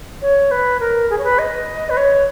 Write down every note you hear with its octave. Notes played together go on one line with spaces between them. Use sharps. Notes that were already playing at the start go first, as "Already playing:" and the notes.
C#5
B4
A#4
G#4
C#5
B4
D#5
B4
C#5